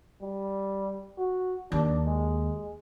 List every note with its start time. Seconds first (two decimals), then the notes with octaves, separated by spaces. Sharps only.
0.22 G3
1.18 F#4
1.72 D#2 D4
2.06 G#3